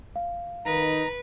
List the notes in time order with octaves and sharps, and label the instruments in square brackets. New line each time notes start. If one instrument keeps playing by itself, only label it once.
[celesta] F5
[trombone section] D#3 D#4 [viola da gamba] B4 [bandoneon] A#5